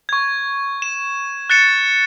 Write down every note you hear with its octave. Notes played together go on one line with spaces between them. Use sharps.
C#6 G#6
E7
F#6 A6 C#7 E7